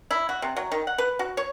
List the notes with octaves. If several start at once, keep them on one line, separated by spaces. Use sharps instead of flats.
E4
F#4
C3
F#3
D#3
F#5
B4
F#4
C#5